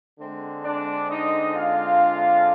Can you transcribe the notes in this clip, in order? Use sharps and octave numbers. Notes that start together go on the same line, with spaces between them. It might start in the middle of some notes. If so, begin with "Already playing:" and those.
D3 G#3 C4
D4 D5
D#4 D#5
F4 F5